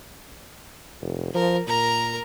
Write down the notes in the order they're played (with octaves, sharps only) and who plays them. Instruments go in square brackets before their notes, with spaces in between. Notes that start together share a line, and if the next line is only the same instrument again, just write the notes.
[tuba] F1
[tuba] F3 [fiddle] A#4
[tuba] A#2 [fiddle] A#4 A#5